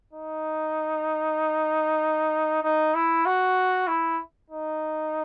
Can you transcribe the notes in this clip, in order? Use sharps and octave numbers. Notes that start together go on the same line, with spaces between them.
D#4
D#4
E4
F#4
E4
D#4